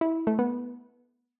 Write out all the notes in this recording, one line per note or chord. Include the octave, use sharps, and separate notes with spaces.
E4
A3
B3